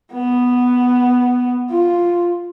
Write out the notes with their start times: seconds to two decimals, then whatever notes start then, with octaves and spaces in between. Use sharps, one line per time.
0.12 B3
1.70 F4